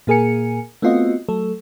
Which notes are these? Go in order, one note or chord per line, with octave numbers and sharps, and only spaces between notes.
A#2 A#3 G#4 A#4 G#5 C#7
A3 B3 C4 F4 F#4 D#5
F#3 A3 A4